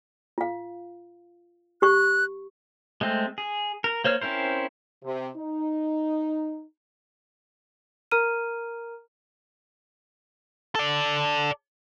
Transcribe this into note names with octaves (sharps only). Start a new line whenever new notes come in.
F4 F5
G4 C#6 F#6
G#3 A3 C4
G#4
A#4
A#3 C5 C#5 F6
C4 C#4 E4 A#4 C5
C3
D#4
A#4 A#5 F6 D#7
A4 D5